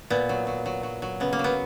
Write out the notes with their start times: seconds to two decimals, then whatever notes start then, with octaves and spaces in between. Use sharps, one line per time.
0.10 A#2 B3
0.29 F#3
0.47 F#3
0.66 F#3
0.83 F#3
1.02 F#3
1.20 C#3 B3
1.33 A#3
1.39 F#3
1.44 B3